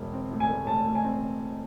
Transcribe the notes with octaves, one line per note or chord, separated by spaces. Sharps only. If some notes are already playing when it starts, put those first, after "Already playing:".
Already playing: E1
C4
A2
G#5
A3
A2 A5
A3
G#5
C4